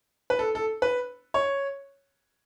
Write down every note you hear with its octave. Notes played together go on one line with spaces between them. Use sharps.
B4
A4
A4
B4
C#5